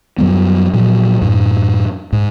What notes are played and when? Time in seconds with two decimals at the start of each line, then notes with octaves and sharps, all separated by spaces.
0.18 F#2 F#3 G3 B3
0.73 A#2 F3 F#3
1.21 F#2 A2
2.12 G#2